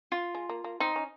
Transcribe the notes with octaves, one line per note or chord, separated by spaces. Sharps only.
F4
G#3
A#3
A#3
C4 D#4
C#4